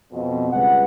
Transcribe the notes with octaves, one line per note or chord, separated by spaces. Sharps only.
F2 B2
C#2 G3 B4 F#5